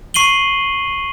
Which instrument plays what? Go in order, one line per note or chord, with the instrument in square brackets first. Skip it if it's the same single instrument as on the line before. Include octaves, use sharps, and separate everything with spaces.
[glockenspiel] C#6 C7 D#7 F#7 G7